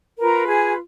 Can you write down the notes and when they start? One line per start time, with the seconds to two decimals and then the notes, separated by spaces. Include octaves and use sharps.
0.19 F4 A#4 B4 A#5
0.47 G#4 G#5